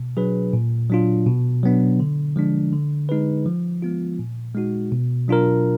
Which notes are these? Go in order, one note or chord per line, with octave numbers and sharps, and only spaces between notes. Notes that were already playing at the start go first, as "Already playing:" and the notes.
Already playing: B2
F#3 D4 G#4 B4
A#2
F#3 D4 F4
B2
F#3 B3 D4
D3
F3 G#3 D4
D3
G#3 D#4 G#4 B4
F3
G#3 B3 F4
A#2
G#3 D#4 F#4
B2
F#3 D4 F4 A#4